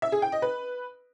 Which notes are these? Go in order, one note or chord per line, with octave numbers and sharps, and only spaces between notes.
E5
G#4
G5
D#5
B4